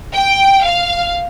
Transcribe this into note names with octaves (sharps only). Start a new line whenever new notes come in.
G5
F5